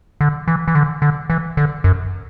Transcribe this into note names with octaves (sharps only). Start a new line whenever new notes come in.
D3
E3
E3
D3
D3
E3
D3
F#2